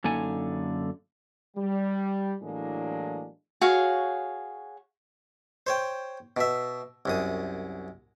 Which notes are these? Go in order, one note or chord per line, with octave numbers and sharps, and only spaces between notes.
F#2 D3 A#3 D#4 A4 G#5
G3
A2 E3 F#3 G#3 A#3 D4
F#4 G#4 C#5 F5
C5 C#5 G5
B2 E5
C2 F#2 D#6